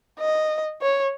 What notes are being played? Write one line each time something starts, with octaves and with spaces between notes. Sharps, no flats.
D#5
C#5